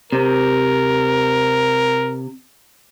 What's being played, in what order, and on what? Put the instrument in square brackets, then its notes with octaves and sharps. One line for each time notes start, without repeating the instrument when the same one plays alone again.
[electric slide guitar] C3 [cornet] A#4